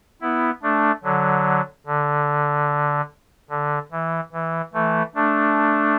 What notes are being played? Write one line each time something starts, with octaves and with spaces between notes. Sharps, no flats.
B3 E4
A3 D4
D3 F#3
D3
D3
E3
E3
E3 A3
A3 D4